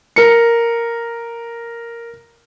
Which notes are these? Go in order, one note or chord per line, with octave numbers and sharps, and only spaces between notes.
A#4 C#7